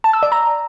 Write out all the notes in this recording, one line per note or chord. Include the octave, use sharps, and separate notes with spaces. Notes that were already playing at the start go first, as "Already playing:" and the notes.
A5
E6
D5
A#5